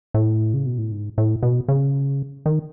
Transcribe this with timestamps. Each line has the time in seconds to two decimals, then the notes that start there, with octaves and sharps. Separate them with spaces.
0.14 A2
0.54 C#3
0.66 B2
0.78 A2
0.92 G#2
1.18 A2
1.43 B2
1.68 C#3
2.46 D#3